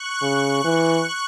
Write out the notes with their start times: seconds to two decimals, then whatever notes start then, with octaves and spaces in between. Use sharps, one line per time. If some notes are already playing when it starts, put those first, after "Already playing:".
Already playing: C#6 F#6
0.22 C#3
0.65 E3